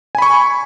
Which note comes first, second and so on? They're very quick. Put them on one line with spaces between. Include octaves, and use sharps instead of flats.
G#5 B5 C#6